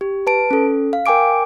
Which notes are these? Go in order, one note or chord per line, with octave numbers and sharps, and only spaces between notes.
G4
B4 A5 D7
C#4 A4
F5
A#4 G5 G#5 D6 D7